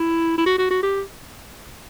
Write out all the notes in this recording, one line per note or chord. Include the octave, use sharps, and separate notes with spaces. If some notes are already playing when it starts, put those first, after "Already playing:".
Already playing: E4
E4
F#4
F#4
F#4
G4